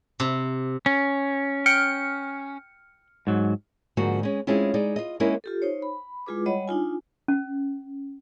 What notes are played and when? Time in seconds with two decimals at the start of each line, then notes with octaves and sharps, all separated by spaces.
0.20 C3
0.86 C#4
1.66 G5 F6 C#7
3.27 G#2 F#3
3.97 G#2 D3 F3 A#3 B3 F#4
4.23 G#3 C#4
4.47 G#3 C4 C#4 E4 F4
4.74 G#3 D#4 D5
4.96 F4 D#5
5.20 G#3 A#3 C#4 D#4 E4 A#4
5.44 F4 G4 A4
5.62 D#4 C5 C#5
5.82 B5
6.26 G#3 E4 F4 G#4 B4 D6
6.46 G3 C#5 D#5 F#5 B5
6.68 D4 D#4 F4 G#5
7.28 C#4